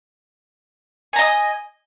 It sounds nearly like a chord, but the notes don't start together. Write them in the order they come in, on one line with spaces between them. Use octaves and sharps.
G#5 A#5 D#5 D#6